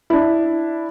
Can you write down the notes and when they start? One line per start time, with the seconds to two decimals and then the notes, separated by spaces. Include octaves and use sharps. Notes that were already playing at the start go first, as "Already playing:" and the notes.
0.10 D4 E4